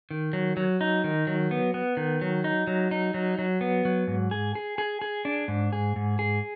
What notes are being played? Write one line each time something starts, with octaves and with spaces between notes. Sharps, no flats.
D#3
F#3
F#3
D#4
D#3
F#3
B3
B3
D#3
F#3
D#4
F#3
D#4
F#3
F#3
B3
F#3
G#2
G#4
G#4
G#4
G#4
D4
G#2
G#4
G#2
G#4